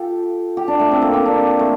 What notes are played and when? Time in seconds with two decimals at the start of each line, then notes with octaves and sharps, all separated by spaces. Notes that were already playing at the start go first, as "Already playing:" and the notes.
Already playing: F4 G4 A4
0.57 G4
0.68 D4
0.80 A3
0.92 C4
1.02 A#3
1.13 C4
1.25 D4
1.59 A3